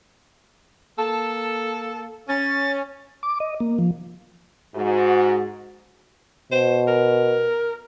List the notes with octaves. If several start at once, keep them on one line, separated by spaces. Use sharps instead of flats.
A#3 A4 A5
C#4 A6
D6
D#5
A#3
F3
G#2 F#4
B2 C5
A#4